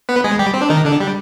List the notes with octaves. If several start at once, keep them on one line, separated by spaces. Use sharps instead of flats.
B3 B4
G#3 G#4
G3 G4
C4
D4
D#3 D#4
D3 D4
G3